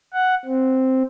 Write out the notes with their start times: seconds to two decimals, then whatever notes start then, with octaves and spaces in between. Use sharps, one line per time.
0.14 F#5
0.46 C4